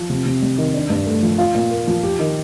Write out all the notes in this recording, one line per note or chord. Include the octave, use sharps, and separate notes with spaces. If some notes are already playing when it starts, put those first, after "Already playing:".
Already playing: F3
C3
C3
G3
D#3
D4
G2
A3
F3
F4
A#2
A#3
F3
G4
D#3